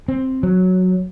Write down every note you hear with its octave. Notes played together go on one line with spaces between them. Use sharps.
C4
F#3